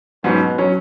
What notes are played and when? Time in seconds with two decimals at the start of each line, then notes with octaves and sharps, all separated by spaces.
0.24 G#2 B2 F#3 C#4
0.58 F#3 C#4